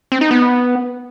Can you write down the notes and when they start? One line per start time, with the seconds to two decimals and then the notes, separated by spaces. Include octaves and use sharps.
0.12 C4
0.21 D#4
0.31 B3